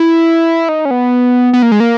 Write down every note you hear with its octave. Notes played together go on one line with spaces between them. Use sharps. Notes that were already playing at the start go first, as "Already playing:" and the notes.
Already playing: E4
D#4
C#4
B3
B3
A#3
G#3
A#3